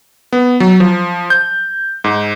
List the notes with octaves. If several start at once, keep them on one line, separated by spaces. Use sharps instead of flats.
B3
F#3
F3
G6
G#2